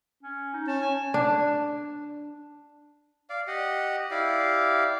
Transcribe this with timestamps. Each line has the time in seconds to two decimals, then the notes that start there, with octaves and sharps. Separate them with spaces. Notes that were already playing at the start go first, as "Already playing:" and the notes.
0.23 C#4
0.53 D#4
0.68 C#4 A5
0.81 G#5
1.14 D4
3.30 D5 F5
3.47 G4 D#5 F#5
4.11 E4 G4 D5 F5